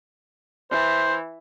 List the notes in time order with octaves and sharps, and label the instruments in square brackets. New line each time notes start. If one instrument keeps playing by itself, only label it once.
[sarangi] E3 [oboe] C5